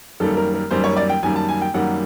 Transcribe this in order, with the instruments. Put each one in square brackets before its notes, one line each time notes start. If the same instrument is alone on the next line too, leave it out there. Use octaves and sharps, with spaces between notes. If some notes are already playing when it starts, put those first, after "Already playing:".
[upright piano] F#2 D#3 G3 A#3 A4
A#4
A#4
F#2 D#3 G3 A#3 C5
C#5
D5
G5
F#2 D#3 G3 A#3 G#5
A5
G#5
G5
F#2 D#3 G3 A#3 F#5